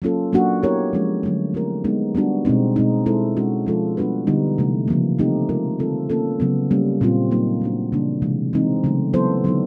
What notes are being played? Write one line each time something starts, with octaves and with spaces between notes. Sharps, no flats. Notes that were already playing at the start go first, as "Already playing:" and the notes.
F#3 A#3 C#4 F4 A4
F#3 A#3 D4 F#4
B3 E4 G4 A#4 C#5
F3 G#3 C#4
D3 F#3 A3
A3 C4 E4 G4 A#4
G#3 B3 D#4
G3 B3 D4 F#4
B2 G#3 C4 D#4
B2 G#3 C4 D#4
G#3 C4 E4 A4 C5
G#3 C#4 F#4
F3 G#3 C#4 F4 A4
G3 B3 D4 F#4 B4
D3 G3 B3 D#4
C3 E3 A3
C#3 F3 A#3
A3 C4 D#4 G4
G#3 C4 F4 A#4
D3 G3 C4 F4 A4
A#3 C#4 F4 A4
C#3 F#3 B3
G3 A#3 C#4
A#2 G3 C4 F4
F#3 A#3 D#4
A3 D4 F#4
C#3 E3 G3 A#3 D4
C3 E3 G#3
E3 G#3 C4 D#4
C#3 F#3 A3
F#3 B3 E4 A4 C5
D3 F#3 B3 D#4